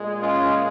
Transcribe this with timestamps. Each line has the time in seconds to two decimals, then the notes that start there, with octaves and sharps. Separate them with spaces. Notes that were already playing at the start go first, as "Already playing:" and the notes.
Already playing: A#2 G#3
0.21 C#4 F4